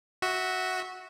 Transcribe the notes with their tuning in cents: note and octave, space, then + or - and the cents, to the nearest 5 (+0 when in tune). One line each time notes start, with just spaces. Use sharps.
F#4 +0 E5 -20